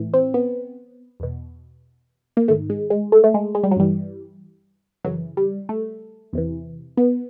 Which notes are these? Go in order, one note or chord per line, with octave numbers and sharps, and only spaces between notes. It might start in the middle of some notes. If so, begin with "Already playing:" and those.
Already playing: A2 E3
C4
B3
E2 B2
A#3
G#2 D#3 A3
G#3
G#3
A3
A3
G#3
G#3
G3
F#3
G2 E3 G3
F#2 C#3 E3 F#3
G3
A3
E2 C3 E3
B3